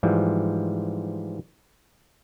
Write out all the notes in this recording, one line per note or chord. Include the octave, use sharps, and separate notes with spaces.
G#2 E3 F3 G3